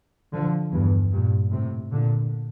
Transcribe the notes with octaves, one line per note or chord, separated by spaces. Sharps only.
D3 F3
E2 G2
G2 A#2
A2 C3
A#2 D3